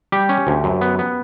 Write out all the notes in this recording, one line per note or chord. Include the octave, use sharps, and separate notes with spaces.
G3 G4
C#4
D2
F#2
B3
B3